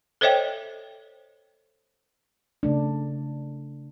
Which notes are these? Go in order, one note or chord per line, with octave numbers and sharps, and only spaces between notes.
A4 C5 C#5 D#5 E5 G5
C#3 A3 D4